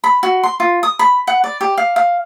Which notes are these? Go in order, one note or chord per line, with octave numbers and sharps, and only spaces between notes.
B5
F#4
C6
F4
D#6
B5
F#5
D5
G4
F5
F5